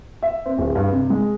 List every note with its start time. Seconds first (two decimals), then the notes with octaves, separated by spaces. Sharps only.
0.23 E5
0.46 C4
0.58 D1
0.75 G2
0.93 C3
1.10 G#3